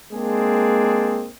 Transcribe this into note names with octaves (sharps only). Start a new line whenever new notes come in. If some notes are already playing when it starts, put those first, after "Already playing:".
G#3 A#3 C4 D4 G#4